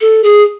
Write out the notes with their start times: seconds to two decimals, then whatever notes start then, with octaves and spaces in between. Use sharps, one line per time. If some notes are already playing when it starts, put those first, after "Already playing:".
0.01 A4
0.24 G#4